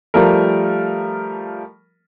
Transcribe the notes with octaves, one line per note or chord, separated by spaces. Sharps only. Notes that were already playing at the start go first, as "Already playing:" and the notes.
F3 G3 A3 A#4